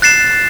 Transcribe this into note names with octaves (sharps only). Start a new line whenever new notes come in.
F#6 A6 C7 E7